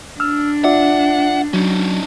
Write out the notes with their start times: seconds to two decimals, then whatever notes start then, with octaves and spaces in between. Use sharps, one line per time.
0.20 D4 E6 F6
0.64 F4 D5 E5 F#5
1.54 F#3 C#4 D#4